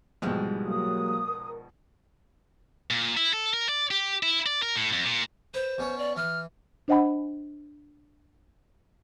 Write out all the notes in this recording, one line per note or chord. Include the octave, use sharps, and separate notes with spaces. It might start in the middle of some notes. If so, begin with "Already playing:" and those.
A#1 G#2 B2 E3 G3 G#3
F#3 A#3 D#6
A#4
A#2
E4
A4
A#4
D5
G4
E4
D5
A#4
A2
F2
A#2
B4 C5
B2 C#4 C#5
D5
E3 F6
D4 C5 D#5 F#5 G#5 B5